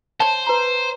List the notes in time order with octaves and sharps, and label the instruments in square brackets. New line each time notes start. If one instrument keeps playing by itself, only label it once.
[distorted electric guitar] C5 [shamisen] C#5 A5
[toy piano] B4 A#5